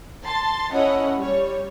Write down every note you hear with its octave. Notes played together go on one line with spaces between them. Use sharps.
A5 C6 A6
C#4 E4 A4 C#5 D#5 F#5
G3 C#5